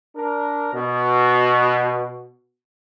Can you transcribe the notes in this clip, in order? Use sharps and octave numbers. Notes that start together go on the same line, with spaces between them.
D4 A#4
B2